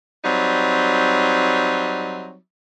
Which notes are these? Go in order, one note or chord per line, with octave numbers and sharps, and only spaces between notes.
F#3 G3 C4 D#4